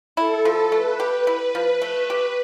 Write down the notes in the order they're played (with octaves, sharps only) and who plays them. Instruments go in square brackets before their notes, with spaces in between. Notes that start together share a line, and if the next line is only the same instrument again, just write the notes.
[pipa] E4 [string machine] A4
[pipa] F3
[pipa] A3 [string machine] B4
[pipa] G4
[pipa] E4 [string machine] B4
[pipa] F3
A3
G4